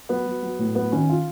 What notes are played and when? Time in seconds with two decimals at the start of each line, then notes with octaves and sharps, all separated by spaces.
0.09 F#3 B3
0.26 F#3
0.42 F#3
0.59 A2
0.75 F#3 B3
0.92 D#3 C#4
1.09 F4